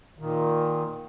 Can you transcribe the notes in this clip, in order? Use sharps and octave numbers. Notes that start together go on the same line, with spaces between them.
A#2 D#3